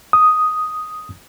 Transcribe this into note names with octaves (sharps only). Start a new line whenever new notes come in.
D#6